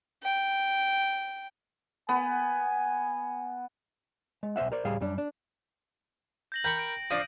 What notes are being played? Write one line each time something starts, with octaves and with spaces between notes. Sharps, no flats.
G5
B3 G#5
G#3
B1 C5 D5 E5 F#5
A#4 C5 D5
C#2 A2 G3 G#4 F5
F#2 G3 D4
D4
G6 A#6 F#7
A#4 G5 B5 C#6
G6 D7
F3 D4 D5 D#6